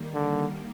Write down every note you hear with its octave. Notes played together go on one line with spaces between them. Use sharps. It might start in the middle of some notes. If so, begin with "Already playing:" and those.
Already playing: D#3 G3 A#3
D3